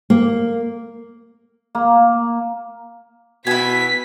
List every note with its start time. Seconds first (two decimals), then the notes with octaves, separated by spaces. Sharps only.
0.10 A#3
1.75 A#3
3.47 B2 E4 G#5 B6